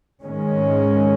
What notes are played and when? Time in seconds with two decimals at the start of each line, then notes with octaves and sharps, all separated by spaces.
0.22 G#2 D#3 G#3 C#4